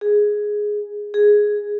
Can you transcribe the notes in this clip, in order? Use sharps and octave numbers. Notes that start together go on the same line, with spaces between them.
G#4
G#4